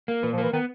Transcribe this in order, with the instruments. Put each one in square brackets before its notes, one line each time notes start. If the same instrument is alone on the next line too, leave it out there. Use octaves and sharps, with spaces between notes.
[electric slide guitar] A#3
[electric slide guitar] A#2 [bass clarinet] E3
[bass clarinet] F3
[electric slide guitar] A#3
[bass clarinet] E3
[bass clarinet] D#3 [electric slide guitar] B3